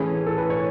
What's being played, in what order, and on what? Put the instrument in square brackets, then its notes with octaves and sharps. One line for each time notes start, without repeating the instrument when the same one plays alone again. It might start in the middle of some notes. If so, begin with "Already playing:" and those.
Already playing: [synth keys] A2 E3 A3 C#4 [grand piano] G#4
[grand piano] A4
B4
C#5